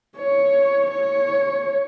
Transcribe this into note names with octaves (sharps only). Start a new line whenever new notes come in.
C#5
C#5